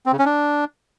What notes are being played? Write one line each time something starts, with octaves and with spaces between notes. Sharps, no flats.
C4
C#3
C#4
D4